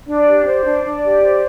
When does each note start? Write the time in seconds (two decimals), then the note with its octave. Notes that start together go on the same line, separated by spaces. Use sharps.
0.07 D4 D5
0.27 G4
0.46 C5
0.64 D4
0.84 D4
1.03 G4
1.23 C5